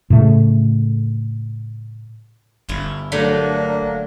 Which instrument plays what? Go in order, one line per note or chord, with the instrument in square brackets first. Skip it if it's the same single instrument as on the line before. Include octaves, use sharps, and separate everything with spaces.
[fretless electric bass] A2 C#3 A3
[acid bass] G1 [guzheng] E4 F4
[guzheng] D3 F#3 A3 [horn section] A#3 D4